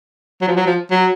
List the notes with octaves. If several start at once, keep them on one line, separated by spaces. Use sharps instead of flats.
F#3
F3
F#3
F3
F#3